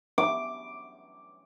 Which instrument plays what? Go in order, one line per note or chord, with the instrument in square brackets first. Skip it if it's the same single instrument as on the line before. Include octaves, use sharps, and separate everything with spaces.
[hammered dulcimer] D6